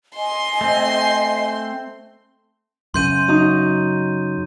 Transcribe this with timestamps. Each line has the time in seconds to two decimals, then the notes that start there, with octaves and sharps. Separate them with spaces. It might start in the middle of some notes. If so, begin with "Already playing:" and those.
0.16 D#5 G#5 C6
0.61 A3 C4
2.94 F#2 C#3 C6 G6 D#7
3.28 F#3 D#4